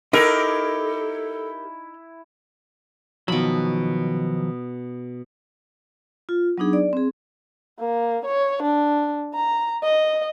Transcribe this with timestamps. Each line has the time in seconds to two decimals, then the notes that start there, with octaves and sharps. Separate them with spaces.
0.13 D#4 E4 G4 A4 A#4
3.28 B2 D#3 F3 F#3 B5
6.29 F4
6.58 F#3 B3 D4 D#4 G#4
6.73 D5
6.93 C4 G#4
7.79 A#3
8.25 C#5
8.62 D4
9.34 A#5
9.83 D#5